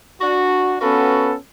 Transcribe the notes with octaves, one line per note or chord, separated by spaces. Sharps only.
D4 F#4
B3 C#4 F4 F#4 A4 B4